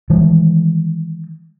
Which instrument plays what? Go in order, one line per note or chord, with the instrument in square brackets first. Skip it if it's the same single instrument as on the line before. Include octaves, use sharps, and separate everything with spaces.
[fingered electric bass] D#3 E3 G3 G#3